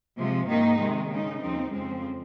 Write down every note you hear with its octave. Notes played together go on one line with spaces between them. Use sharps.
C3 F3 G#3
G#2 D#3 A#3 D#4
C3 D#3 G#3
C#3 G#3 D#4
D#2 C#3 F3 C4 D#4
F2 C#3 F3 G#3 C4